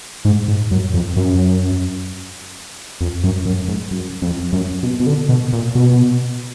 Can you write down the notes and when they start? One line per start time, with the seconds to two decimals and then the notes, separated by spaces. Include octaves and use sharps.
0.25 G#2
0.48 G#2
0.71 F#2
0.94 F2
1.16 F#2
3.01 F2
3.24 F#2
3.46 F#2
3.68 G#2
3.91 F#2
4.22 F2
4.53 F#2
4.83 B2
5.00 B2
5.07 D3
5.29 B2
5.53 A#2
5.75 B2